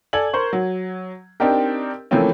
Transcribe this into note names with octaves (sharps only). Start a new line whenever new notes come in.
A4 D5 G#5 G#6 F#7
A#4 C5 C#6
F#3
C4 D4 D#4 G4 A#4
E3 F3 A3 A#3 C4 C#4